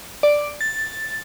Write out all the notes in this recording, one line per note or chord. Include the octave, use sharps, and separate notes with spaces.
D5
A6